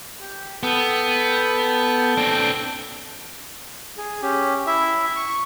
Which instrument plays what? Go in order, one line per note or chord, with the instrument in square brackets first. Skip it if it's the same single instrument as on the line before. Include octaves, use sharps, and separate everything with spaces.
[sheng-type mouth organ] G4
[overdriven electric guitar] B3 [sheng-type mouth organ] A4 G5
[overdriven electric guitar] C4 D4
[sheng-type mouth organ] G#4
C#4 G4
E4 E5
C#6